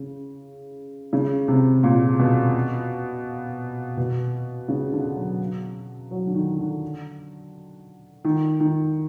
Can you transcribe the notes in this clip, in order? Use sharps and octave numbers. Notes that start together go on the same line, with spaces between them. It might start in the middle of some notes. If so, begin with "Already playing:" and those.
Already playing: C#3
C#3
C3
A#2
B2
B2
C#3
D3
F#3
F#3
D3
D#3
D3
D#3
D#3